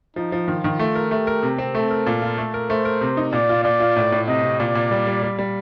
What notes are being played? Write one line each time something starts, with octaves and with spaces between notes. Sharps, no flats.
F3 D#4
F3
D#3 F4
D#3
A3
A#4
A3 G4
A#4
C3
C4
A3 A4
A#4
A#2
F4
A3
A#4
A3 C5
A#4
C3
D#4
A#2 D5
F4
A#2 D5
F4
A2
A2
C3 D#5
C3
A#2 D5
A#2
G3
G3
G3
G3